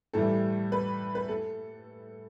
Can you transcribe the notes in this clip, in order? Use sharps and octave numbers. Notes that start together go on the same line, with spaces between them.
A2 E3 G3 A4
B4
B4
A4